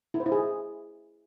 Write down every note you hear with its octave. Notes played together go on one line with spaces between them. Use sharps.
E4
C5
E4
G#4